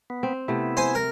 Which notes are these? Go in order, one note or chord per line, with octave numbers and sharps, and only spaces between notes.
B3
C4
C3 A3 B3 E4
C5 G#5
A#4